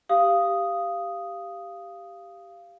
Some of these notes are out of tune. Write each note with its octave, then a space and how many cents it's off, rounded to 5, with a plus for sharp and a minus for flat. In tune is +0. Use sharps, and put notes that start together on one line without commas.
G4 +0 F5 -15 D#6 +0